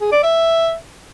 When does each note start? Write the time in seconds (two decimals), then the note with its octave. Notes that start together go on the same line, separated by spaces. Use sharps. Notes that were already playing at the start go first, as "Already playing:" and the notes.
0.01 G#4
0.12 D5
0.23 E5